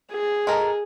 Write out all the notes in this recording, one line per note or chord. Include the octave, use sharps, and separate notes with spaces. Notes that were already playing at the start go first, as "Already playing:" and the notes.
G#4
G#3 A4 A#4